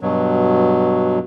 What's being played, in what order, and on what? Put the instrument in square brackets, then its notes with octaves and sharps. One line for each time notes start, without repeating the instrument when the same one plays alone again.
[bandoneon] G2 B2 F#3